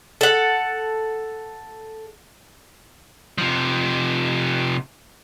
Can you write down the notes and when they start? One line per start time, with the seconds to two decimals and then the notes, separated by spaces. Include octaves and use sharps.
0.21 A4 F#5
3.38 C3 F3